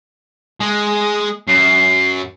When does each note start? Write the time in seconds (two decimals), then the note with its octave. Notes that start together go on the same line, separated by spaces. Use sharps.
0.60 G#3 D#6
1.48 F#2 C7